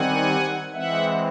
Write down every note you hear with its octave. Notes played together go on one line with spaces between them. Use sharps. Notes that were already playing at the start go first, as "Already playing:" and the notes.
Already playing: D#3 G3 C4 F#5 G#5
E3 G#3 C4 E5 F#5